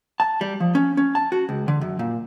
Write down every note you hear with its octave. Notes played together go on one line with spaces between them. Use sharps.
A5
G3
F3
C#4
C#4
A5
F#4
C#2
D3
F#2
A#2